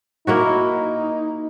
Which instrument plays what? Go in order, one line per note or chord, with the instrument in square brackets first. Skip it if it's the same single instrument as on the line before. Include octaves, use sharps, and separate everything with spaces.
[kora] A#3 E4 F#4 [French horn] D#4